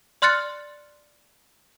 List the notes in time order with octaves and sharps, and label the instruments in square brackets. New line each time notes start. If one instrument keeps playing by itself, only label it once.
[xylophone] D5 C6 F6 F#6 A6 C#7